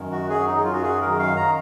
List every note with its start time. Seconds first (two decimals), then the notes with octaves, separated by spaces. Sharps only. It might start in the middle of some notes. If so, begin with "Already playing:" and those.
Already playing: F#2 D#3
0.12 F#4
0.29 F#3 G#4
0.47 D#4
0.63 F#2 F4
0.73 F#4
0.83 G#4
1.01 D#3 A#4
1.19 F5
1.36 A#5